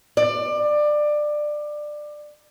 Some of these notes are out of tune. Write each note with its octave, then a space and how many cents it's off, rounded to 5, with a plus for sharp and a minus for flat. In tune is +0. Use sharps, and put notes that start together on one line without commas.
D5 +20